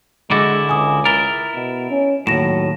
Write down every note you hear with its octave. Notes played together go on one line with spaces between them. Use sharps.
D3 G#3 E4 F#4 D6 A6
C#2 G#5 D6 D#6
E4 A#4 A6 F7 G7
B2
C#4
D#2 A2 F#3 A#6 E7